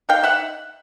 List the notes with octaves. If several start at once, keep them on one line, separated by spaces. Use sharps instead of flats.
D#4 F5 G5
E5 F#5